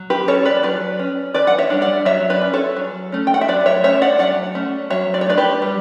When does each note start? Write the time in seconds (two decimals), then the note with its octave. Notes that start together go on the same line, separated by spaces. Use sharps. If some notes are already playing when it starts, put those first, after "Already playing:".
Already playing: F#3
0.10 G4 B4
0.28 C#4 A4 C#5
0.45 B4 D5
0.63 F#3 B4 D5
0.99 C#4
1.34 E3 B4 D5
1.47 F#5
1.58 C#5 E5
1.70 G3 D4
1.82 D5 F#5
2.05 F#3 C#5 E5
2.30 B4 D5
2.42 C#4
2.53 A4 C#5
2.76 F#3
3.12 A3 C#4
3.27 G5
3.34 F#5
3.41 E5
3.48 F#3 B4 D5
3.66 C#5 E5
3.84 A3 C#4 C#5 E5
4.01 D5 F#5
4.19 F#3 D5 F#5
4.55 A3 C#4
4.90 F#3 C#5 E5
5.14 D5
5.21 C#5
5.26 A3 D4 B4 D5
5.37 G4 B4
5.62 G3